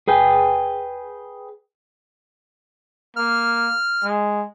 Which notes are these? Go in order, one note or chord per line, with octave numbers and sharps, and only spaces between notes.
G#4 B4 G5 G#5
A#3 F6
G#3